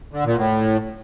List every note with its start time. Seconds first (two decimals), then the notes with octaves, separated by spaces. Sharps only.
0.13 D3
0.25 A#2
0.37 A2